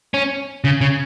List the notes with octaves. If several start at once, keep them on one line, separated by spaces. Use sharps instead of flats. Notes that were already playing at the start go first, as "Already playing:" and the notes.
C#4
C#3
C#3